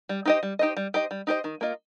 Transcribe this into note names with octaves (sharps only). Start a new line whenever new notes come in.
G3
D#4 G4 C5 D#5
G3
D#4 G4 C5 D#5
G3
D#4 G4 C5 D#5
G3
D#4 G4 C5 D#5
D#3
A#3 F4 A#4 D#5